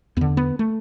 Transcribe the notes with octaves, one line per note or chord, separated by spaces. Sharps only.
E2 D3 B3
B3
A3